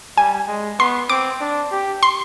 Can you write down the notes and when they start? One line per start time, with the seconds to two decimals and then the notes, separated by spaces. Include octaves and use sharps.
0.17 G3 G#5
0.48 G#3
0.79 B3 C6
1.10 C4 D6
1.41 D4
1.72 G4
2.03 C6